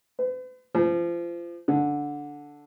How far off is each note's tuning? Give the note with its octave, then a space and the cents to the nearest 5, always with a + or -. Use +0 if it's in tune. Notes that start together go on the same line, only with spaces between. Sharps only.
B4 +45
F3 -30
D3 -5